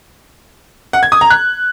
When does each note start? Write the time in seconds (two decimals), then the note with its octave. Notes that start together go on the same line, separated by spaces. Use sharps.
0.93 F#5
1.03 G#6
1.12 D#6
1.21 A#5
1.30 F#6